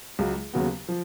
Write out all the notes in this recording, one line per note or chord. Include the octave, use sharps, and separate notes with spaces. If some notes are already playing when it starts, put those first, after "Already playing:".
C#2 C#3 F#3
D#2 C#3 F#3 B3
F3